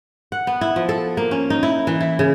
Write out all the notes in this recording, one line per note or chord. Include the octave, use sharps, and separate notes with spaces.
F#5
B3
E4
F3
A4
A#3
C#4
D#4
E4
E3
E4
C#3